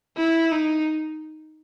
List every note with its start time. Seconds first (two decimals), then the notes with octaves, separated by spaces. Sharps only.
0.18 E4
0.52 D#4